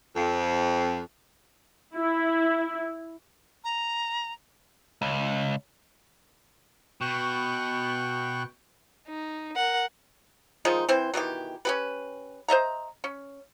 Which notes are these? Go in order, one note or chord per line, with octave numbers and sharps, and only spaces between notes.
F2
E4
A#5
C#2
B2 G5 C#6 F#6
D#4
A#4 F#5
D#3 F3 G#3 D#4
E3 C4 C5
B2 D#3 E3 G4
C#4 G4 B4
C5 D#5 E5 A#5
C#4